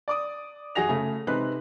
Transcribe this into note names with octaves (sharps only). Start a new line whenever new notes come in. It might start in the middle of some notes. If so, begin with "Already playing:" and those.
D5 D6 D#6
F#2 F#4 G#4 A#6 F7
C#3 A3
C3 G#3 C4 D#4 B4 F#6